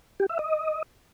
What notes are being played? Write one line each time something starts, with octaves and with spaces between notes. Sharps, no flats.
G4
E5
D#5